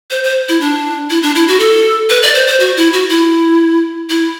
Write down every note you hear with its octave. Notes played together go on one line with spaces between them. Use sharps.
C5
C5
E4
D4
E4
D4
E4
F#4
A4
B4
D5
C5
C5
F#4
E4
F#4
E4
E4